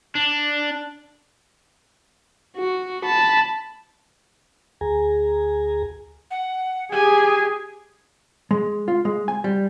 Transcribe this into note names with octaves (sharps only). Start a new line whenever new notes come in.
D4
F#4
A5 B5
D2 G#4 G#5 A#5
F#5
G4 G#4 G#5
G#3
F4
G#3
G#5
G3